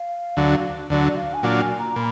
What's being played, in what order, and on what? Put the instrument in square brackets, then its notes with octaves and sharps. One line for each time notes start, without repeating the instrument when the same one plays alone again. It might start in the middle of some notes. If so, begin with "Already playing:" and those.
Already playing: [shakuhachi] F5
[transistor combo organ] D2 D3 F#3
[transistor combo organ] D2 D3 F#3 [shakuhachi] D5
[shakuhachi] F5
G#5
[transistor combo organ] A#2 F#3 D4 F4 [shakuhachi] F#5
[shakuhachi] G#5
A#5
[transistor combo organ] A#2 [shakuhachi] B5